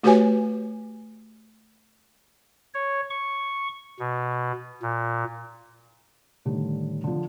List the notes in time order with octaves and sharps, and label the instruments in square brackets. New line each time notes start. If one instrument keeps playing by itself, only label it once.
[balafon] A3 F#4 G4 B4 C#5 G#5
[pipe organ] C#5
C#6
B2
A#2
[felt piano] A2 D3 D#3 G3 A3
D3 F3